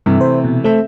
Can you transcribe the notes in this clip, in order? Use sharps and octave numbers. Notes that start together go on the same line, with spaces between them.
G2 C3 E3 A3
C5
B2
A3 C4 A4 E5